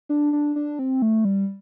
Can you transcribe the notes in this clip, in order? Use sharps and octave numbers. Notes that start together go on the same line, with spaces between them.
D4
D4
D4
C4
A3
G3